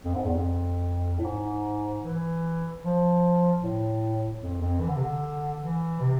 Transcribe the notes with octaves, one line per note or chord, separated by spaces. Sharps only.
F2
G#2
E2
F2
A2
G#2
E3
F3
A2
F2
F2
E3
D3
C3
D3
E3
C3